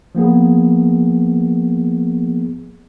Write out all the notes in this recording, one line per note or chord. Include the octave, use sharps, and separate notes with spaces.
F3 A#3 B3 G#4